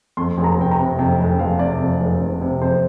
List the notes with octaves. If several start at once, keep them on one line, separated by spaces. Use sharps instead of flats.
F2 C6
F1
A#5
F1 G5
A#5
C3
F2 G5
F1 G5
F1 F5
C3 D5
F2
F1
F1
C3
F2 C5